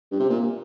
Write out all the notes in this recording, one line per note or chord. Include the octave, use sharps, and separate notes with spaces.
G2
C3
A#2